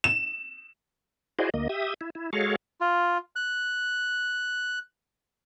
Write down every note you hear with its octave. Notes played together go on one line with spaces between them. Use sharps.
E7
E4 F#4 G#4 C5 D5 D#5
D2 A#3 D#5
G4 E5 D#6
E4
E4
G#3 F#4 G#4 A4 C#5 F5
F4
F#6